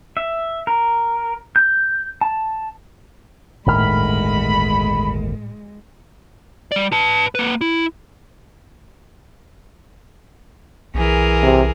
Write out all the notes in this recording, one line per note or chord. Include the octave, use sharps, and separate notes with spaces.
E5
A#4
G6
A5
G1 D2 A2 D#3 G#3 B5 F6
G3 D5
B4 A5
A#3 B4
E4
B1 E3 G#4 A#4
C3